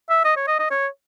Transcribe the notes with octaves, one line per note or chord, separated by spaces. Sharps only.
E5
D#5
C#5
D#5
D#5
C#5